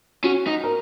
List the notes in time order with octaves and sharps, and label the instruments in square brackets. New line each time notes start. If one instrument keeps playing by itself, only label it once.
[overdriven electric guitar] C#4 [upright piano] F#4
[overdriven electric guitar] D#4
[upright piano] A#4